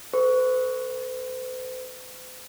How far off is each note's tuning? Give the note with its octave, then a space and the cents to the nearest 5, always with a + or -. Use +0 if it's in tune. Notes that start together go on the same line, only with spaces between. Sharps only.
A4 +20 C5 -45 C#6 +20